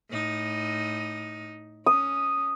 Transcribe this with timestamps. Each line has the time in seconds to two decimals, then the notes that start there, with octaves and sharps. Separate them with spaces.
0.11 A2 D#4
1.86 C#4 D#6